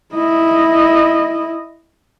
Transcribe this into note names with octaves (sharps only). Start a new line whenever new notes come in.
E4 D#5